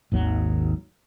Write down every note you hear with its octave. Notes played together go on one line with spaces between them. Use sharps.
G#1 D#2 F#3